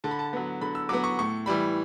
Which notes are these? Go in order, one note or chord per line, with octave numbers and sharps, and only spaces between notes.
D3 A5
B5
A5
F#3 B3
D3 B5
E6
F#3 B3 D6
C#6
A2 C#6
E3 G3 B5